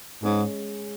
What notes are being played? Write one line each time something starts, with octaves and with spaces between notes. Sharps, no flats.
G#2 G#3 C#4 G#4 C#5